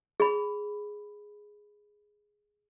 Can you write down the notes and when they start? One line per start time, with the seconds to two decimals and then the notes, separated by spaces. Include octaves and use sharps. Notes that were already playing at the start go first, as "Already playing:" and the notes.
0.20 G#4 B5